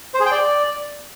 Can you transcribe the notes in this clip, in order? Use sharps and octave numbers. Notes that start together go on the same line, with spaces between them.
C5
G#4
G5
D5